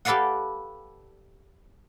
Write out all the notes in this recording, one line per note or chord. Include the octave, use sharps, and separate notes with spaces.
G4 A4 B4 D5 F5 F#5